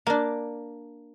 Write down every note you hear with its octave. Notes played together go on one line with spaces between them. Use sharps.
A#3 D4